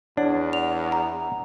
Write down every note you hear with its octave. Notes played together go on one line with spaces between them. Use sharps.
E2 D4 C#5 F#5
F7
A#5